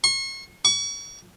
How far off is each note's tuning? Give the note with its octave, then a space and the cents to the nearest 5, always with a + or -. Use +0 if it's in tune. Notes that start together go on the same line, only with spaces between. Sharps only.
C#6 -40
C#6 +35